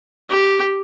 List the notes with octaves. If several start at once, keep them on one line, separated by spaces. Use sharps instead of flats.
G4